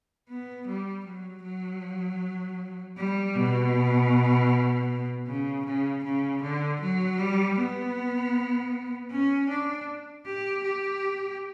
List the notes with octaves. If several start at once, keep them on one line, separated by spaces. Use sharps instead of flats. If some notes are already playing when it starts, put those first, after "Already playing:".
B3
G3
F#3
F#3
G3
B2
C#3
C#3
C#3
D3
F#3
G3
B3
C#4
D4
G4
G4